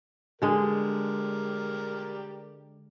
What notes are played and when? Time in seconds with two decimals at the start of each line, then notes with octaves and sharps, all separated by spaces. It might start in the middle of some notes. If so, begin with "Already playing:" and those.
0.42 D3 G#3 G4 A#4 D5